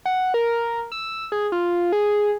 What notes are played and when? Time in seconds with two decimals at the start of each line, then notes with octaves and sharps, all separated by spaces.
0.05 F#5
0.34 A#4
0.92 E6
1.32 G#4
1.52 F4
1.92 G#4